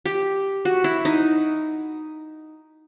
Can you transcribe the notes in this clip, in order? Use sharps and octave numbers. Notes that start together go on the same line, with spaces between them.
G4
F#4
E4
D#4